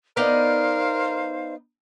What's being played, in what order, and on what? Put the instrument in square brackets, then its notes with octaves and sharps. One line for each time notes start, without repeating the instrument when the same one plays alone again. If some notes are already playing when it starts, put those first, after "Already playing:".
[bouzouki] B3 D#4 D5 [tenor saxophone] A#4 [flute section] C5 F5